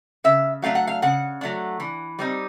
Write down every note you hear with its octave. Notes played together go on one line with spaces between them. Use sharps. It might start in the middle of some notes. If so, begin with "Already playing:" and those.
C#3 E5
F#3 A3 D4 F5
F#5
F5
C#3 F#5
F#3 A3 D4
E3
G3 C4 D#4